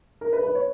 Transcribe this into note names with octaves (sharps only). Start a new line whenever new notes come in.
A#4
B4
B4
C#5